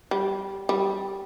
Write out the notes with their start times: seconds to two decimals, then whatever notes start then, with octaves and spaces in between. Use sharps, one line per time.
0.11 G3
0.69 G3